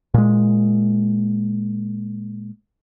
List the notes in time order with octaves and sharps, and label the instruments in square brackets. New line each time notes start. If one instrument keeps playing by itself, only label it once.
[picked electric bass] A#2 G#3